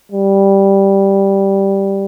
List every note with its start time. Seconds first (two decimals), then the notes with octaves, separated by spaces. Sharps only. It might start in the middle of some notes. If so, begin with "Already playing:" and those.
0.12 G3